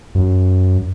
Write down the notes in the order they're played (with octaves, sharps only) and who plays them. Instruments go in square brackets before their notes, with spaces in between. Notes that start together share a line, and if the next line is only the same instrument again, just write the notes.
[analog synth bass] F#2